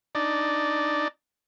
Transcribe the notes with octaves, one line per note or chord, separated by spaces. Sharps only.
D4 D#4 D5